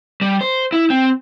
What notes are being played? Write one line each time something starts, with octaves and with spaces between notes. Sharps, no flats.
G3
C5
E4
C4